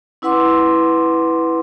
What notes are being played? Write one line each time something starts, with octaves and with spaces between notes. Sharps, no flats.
C#4 E4 B4 F#5 C6 D6